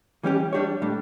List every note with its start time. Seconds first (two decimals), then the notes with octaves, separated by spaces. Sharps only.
0.23 E3 G3 C#4 G4
0.53 G3 D4 G4 C#5
0.82 A2 G3 D4